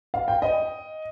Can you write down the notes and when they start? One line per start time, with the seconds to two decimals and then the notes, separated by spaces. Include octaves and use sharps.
0.14 F5
0.28 G5
0.42 D#5